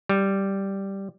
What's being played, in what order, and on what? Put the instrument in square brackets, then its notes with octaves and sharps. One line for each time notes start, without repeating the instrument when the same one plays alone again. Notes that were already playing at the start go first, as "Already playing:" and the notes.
[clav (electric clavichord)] G3